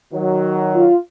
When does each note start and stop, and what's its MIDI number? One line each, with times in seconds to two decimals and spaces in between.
0.13 0.89 51
0.13 0.89 54
0.75 0.96 65